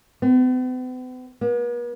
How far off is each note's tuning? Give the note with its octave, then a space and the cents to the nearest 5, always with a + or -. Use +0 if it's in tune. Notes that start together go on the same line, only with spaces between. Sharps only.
B3 +45
B3 -45